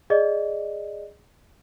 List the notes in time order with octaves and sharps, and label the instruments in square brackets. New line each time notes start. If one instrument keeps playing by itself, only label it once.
[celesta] G#4 D5 D#5